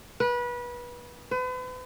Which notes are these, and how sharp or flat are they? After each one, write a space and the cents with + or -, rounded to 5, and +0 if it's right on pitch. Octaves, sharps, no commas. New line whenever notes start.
B4 -25
B4 +40